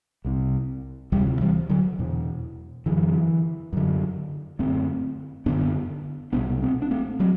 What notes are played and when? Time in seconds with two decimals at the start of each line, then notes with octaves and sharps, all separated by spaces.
0.25 C2 C3
1.12 D2 E3 G3
1.16 C3
1.41 E3 G3
1.69 D3 F#3
1.99 E2 B2
2.86 F#2 D3 E3
3.73 F#2 D3
4.59 F#2 D3 A3 C4
5.46 F#2 D3 B3 D4
6.33 C2 B2 B3 D4
6.62 A3 C4
6.82 D4
6.91 A3 C4
7.20 F#3 A3